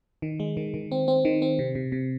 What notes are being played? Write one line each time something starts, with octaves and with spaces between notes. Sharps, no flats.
D#3
G#3
D#3
D#3
C4
C4
D#3
C4
C3
C3
C3